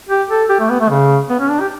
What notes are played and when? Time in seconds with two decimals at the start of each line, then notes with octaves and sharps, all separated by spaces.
0.09 G4
0.30 A4
0.49 G4
0.60 A3
0.70 B3
0.80 A3
0.90 C#3
1.30 B3
1.40 C#4
1.50 D4
1.60 G4